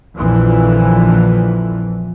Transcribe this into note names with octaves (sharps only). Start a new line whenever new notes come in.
A#1 F2 D3 E3 F3